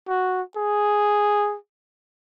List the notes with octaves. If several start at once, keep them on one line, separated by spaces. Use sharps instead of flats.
F#4
G#4